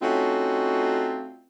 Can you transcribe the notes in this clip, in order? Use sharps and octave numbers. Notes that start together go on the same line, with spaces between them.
A3 C4 C#4 D#4 F4 F#4